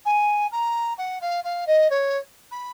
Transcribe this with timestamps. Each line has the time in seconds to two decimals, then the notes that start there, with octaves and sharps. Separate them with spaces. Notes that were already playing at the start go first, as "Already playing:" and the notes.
0.05 G#5
0.51 A#5
0.98 F#5
1.21 F5
1.44 F5
1.67 D#5
1.90 C#5
2.51 B5